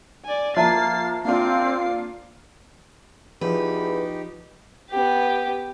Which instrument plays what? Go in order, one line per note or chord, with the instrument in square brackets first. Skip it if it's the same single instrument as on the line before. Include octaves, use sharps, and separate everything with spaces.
[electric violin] D5 G#5
[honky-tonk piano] F3 [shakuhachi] A#3 [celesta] E5 A5 A#5 [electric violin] A6 C7
[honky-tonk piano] A#3 D4 F4 [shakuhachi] C4 [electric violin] D6 C7
[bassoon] E2 [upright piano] F3 [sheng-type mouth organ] D#4 G4 [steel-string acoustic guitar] B4
[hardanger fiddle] B3 G4